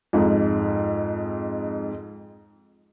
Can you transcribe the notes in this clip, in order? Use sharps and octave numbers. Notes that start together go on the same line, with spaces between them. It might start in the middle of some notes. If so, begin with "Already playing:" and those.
F2 G#2